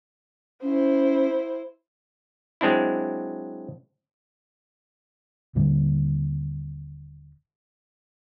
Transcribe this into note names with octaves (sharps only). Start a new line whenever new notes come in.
C#4 E4 C5
F#3 G#3 C4 D4 E4
D#1 A#2 D3 G3